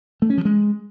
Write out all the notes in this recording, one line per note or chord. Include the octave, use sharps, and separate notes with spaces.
A3
C#4
F3
G#3